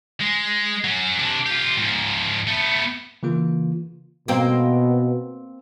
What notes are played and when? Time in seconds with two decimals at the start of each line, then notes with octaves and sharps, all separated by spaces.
0.21 G#3
0.84 F#3 C#4
1.19 C3 D4
1.46 F4 G4
1.77 G#2 F3
2.47 A3 B3
3.23 C#3 E3 A#3 F4
4.28 B2 A#3 C4